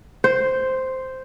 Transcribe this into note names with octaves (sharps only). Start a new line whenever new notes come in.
C5